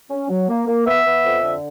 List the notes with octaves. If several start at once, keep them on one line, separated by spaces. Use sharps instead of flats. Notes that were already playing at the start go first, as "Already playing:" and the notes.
C#4
F#3
A#3
A#3
B3 E5
B3
F2
D3